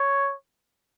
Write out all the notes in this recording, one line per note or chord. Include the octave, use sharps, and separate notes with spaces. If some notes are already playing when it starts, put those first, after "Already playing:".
Already playing: C#5